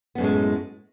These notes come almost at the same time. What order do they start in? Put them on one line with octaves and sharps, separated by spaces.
B3 F#2 A2 G#3